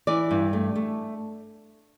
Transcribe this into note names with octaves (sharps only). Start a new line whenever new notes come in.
E3 D5
G2
A3
A3